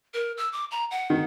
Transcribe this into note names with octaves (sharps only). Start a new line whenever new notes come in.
A#4
E6
D6
A#5
F#5
D#3